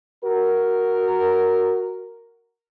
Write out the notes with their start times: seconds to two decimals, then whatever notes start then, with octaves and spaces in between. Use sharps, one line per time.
0.25 F#4 A#4